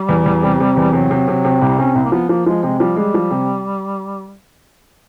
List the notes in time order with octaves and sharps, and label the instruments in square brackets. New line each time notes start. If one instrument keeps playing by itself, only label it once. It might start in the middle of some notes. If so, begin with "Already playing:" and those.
Already playing: [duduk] G3
[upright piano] E2
E2
C3
C3
E2
[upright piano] C3 [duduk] F#3
[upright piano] C3
C3
C3
[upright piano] C2 [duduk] G3
[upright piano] C3 [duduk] C#4
[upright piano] C2 [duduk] C4
[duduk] A#3
[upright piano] F3 [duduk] B3
[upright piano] F3 [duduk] A#3
[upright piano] F3 [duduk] G#3
[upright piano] C3 [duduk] G#3
[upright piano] F3 [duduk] G3
[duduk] G3 [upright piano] G#3
[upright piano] F3
C3